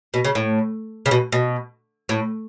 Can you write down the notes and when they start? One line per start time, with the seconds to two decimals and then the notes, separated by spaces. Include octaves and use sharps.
0.14 B2
0.25 C#3
0.35 A2
1.06 C#3
1.11 B2
1.32 B2
2.09 A2